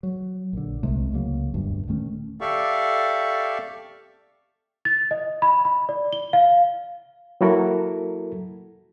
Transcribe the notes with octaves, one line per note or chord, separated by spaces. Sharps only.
F#3
A#1 D3
C2 C3 G#3 A3
C#2 C#3 F#3 A#3
E1 D2 G2
D#1 D#3 A3 C#4
G4 A4 D5 E5 F5 C#6
A6
D#5
B5
B5
D5
G7
F5
F#3 A#3 E4 F#4 A4 A#4